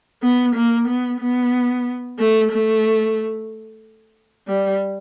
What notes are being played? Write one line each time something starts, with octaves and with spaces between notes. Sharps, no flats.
B3
A#3
B3
B3
A3
A3
G3